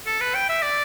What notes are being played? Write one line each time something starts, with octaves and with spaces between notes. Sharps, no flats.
A4
B4
G5
E5
D5